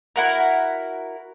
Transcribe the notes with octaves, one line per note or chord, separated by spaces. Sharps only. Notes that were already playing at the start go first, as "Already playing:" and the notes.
E4 F#4 A#4